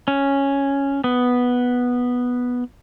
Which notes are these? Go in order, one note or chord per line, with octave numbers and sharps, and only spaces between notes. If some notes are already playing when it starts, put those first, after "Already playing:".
C#4
B3